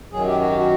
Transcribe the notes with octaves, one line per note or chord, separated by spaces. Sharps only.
F#2 D#3 F#3 G#4
G4
F#4
G4
F#4